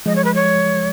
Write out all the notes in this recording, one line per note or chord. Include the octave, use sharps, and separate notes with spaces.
F3 G#3 D#5
C#5
B4
C#5